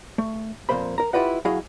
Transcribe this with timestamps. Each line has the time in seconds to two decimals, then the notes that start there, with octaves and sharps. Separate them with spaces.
0.18 A3
0.69 F2 A#2 A#3 C5 B5
0.98 A#4 A#5
1.13 E4 F4 G4 B4 D#5 F#5
1.45 F#3 E4 F#4 G#4 D#5 F5